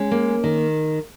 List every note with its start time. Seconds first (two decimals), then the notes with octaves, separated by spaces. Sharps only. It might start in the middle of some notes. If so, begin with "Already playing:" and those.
Already playing: G#3 C#4
0.11 A#3
0.44 D#3